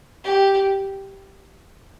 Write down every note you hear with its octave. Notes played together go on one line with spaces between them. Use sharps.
G4